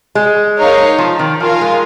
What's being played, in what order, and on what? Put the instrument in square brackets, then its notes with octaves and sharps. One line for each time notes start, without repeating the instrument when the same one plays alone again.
[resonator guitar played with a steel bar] G#3
[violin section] D#4 A#4 C#5 F5
[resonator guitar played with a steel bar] F3
D#3
[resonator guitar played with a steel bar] F3 [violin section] F4 A#4 F5 G#5
[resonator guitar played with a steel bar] G#3